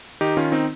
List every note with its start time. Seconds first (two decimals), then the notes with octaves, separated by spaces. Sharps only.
0.21 D#3 D#4 G4
0.37 D#3 C#4 F4
0.52 C4 D#4